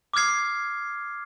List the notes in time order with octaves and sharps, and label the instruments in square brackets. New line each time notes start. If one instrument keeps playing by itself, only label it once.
[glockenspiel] D6 D#6 F6 G#6 C7